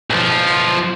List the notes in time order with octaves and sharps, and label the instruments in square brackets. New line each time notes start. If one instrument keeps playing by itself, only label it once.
[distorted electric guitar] B1 F3